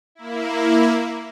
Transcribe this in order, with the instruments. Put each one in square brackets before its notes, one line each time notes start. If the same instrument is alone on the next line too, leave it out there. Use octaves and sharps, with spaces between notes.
[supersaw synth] A#3 E4